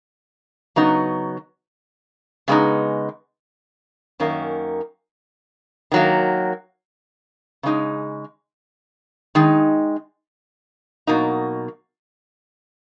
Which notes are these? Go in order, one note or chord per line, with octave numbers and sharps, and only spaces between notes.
C#3 F#3 B3 D#4
C#3 G#3 B3 D#4
F#2 D#3 A#3 C#4
D#3 F#3 A#3
C#3 G#3 D#4
D#3 G#3 D#4
B2 F#3 A#3 D#4